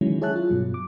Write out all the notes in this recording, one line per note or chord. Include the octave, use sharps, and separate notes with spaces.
D#3 E3 F#3 G#3 C#4 E4
G#4 C#5 E5 A5 F#6
F4
G2 B2 F#3
D6